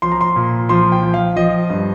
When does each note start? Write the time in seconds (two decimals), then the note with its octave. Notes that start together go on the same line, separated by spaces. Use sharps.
0.02 F3 C6
0.12 A#5
0.21 C6
0.36 A#2
0.69 F3 C6
0.92 G5
1.03 F3
1.14 F5
1.36 F3 D#5
1.70 G2